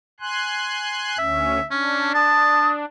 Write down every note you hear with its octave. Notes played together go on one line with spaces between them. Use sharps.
G#5 C6 F#6
D2 C#4 E5
C#4 D4
A5 D#6